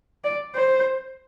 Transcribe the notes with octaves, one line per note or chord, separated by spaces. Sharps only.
D5
C5